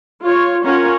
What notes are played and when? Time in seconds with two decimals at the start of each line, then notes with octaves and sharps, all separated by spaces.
0.22 F4 C#5
0.64 C#4 F4 A#4 C#5 F#5